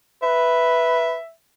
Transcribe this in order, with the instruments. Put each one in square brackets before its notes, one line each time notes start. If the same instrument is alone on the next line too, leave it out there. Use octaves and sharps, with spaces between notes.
[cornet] B4 [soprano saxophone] E5